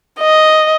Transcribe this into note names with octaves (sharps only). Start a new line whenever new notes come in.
D#5